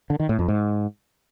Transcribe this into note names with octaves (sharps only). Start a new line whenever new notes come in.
D3
D#3
A2
F2
G#2